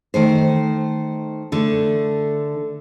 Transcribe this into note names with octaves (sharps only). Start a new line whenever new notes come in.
D#3 A3 C5
D3 A3